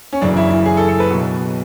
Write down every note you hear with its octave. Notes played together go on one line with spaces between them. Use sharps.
C#4
F#1 F#2 C#3 E3 D4
E4
E4
G#4
A4
A4
B4
B1 B2